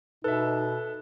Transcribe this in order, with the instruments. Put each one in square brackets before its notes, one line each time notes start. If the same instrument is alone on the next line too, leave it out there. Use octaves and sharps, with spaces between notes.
[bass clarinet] B2 [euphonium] D#4 [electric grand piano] A4 E5 [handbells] B4